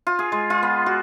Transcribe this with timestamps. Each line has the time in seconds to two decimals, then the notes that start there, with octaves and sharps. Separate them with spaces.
0.07 F4
0.19 G#4
0.32 G#3
0.50 F4
0.63 B3
0.86 F#4